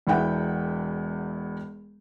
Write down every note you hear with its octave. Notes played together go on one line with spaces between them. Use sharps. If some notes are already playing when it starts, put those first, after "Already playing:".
E1 E2 E4 F#5 G5